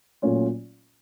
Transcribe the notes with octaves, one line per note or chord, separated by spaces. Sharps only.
A#2 F#3 A3 C#4 F4